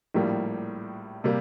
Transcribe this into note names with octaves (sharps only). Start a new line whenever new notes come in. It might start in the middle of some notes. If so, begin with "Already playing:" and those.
A#1 A2 G3 A#3
C3 G3 A#3